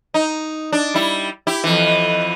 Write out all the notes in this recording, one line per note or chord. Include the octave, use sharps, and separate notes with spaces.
D#4
D4
G3 E4
E4 G4
F2 E3